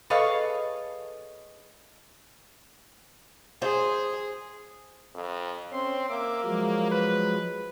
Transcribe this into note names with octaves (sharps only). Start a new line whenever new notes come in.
G#4 A4 B4 C#5 D#5 F5
G#4 C5
F2
C4 C#4 C6
A#3 E5 D6
F3 F#3 G#3
B4